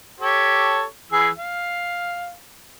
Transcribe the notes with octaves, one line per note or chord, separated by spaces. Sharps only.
G4 A4 C#5
E3 G#4 E6
F5